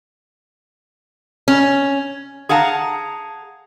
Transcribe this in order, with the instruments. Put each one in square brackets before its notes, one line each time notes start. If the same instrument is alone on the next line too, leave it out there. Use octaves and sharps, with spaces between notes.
[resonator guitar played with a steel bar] C#4
G#4 F5 F#5 A5 A#5